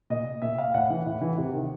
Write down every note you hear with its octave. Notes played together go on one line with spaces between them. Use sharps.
A#2 D#5
A#2 E5
F5
A2 F#5
E3
A2
E3
C3
D#3